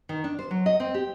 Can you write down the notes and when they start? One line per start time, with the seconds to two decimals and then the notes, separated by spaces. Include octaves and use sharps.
0.09 D#3
0.24 D4
0.39 C5
0.51 F#3
0.66 D#5
0.80 C4
0.94 G4